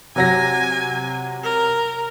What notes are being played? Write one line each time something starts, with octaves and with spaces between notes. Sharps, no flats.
C3 F#3 G#5 A#6
A#4